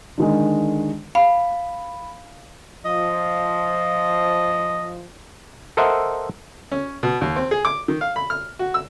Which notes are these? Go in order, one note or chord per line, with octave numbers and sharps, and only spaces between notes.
D3 D#3 G#3
F5 B5
F3 D#5
A4 A#4 C5 D#5 E5 F#5
C#4
B2
D#2
C4
G#4
D6
D#3
F5
B5
F6
F#4
E6